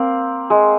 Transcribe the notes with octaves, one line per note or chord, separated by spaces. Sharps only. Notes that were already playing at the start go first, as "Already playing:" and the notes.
Already playing: A#3 C4
G#3